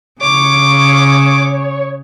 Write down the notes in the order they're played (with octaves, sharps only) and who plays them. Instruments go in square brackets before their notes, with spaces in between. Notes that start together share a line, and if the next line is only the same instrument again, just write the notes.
[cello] C#3 [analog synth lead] C#5 [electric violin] D6